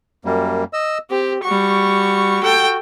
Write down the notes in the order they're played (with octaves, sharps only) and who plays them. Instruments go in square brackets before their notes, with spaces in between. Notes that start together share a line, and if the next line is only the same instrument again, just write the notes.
[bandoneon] F#2 G3 A#3
D#5 E6
[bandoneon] C4 [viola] G4
[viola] G3 C#6 [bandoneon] F#4
[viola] A4 G5